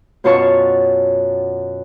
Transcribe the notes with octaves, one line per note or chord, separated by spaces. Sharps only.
F#2 B2 F4 C#5 A5 C#6